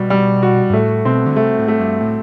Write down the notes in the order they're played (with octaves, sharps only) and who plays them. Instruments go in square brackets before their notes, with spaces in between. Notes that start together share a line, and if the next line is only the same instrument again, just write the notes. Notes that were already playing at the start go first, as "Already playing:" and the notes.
Already playing: [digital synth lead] B2 [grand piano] G3 F#4
[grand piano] G3
F#4
[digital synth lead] G2
[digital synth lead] A2 [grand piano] A3
[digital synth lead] B2 [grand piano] C4
[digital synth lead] D3
[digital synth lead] C3 [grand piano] A3
[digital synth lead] A2
[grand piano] A3
[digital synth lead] G2
A2